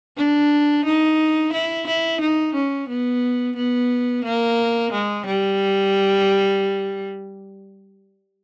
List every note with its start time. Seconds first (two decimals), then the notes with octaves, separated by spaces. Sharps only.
0.17 D4
0.85 D#4
1.52 E4
1.87 E4
2.20 D#4
2.55 C#4
2.89 B3
3.56 B3
4.24 A#3
4.92 G#3
5.26 G3